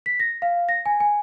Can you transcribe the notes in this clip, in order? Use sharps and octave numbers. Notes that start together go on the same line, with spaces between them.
B6
A#6
F5
A#6
G#5
G#5